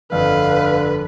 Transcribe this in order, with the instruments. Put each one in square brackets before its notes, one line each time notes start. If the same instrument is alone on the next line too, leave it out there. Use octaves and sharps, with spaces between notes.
[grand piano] G1 F2 [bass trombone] D3 [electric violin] B4 [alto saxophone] F5